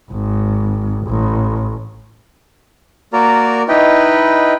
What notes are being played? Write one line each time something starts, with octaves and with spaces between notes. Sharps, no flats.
G#1
A1
A#3 F#4 A#4 D5 A#5
D#4 E4 B4 D#5 G5